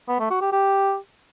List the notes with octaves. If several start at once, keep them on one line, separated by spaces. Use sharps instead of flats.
B3
A3
F#4
G4
G4